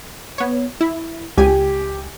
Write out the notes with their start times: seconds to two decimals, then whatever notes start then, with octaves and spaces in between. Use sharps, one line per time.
0.38 B3 C#5
0.81 E4
1.37 C#2 G4 G#5